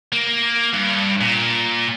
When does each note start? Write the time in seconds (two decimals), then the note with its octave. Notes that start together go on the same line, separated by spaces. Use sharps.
0.12 A#3
0.73 G2
1.21 A#2